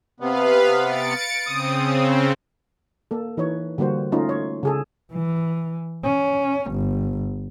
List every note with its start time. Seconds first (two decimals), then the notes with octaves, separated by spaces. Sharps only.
0.20 C3 B3 B4 F5
0.84 A6 C#7 D7
1.47 C#3 C4 D#6
3.11 A#3 A4
3.37 E3 D#4 B4 C#5
3.78 D3 G3 A#3 F#4 C5
4.12 A3 C#4 D#4 F4
4.29 C#5
4.63 C#3 G#4 A4
5.13 E3
6.04 C#4
6.72 G1